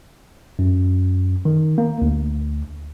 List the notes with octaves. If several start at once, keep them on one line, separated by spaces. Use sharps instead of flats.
F#2
D#3
A#3
D2